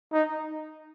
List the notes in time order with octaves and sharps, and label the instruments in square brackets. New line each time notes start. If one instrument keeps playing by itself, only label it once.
[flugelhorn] D#4